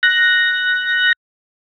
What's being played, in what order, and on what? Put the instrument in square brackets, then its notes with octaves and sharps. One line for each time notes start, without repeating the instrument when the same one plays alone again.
[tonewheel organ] F#6 A#6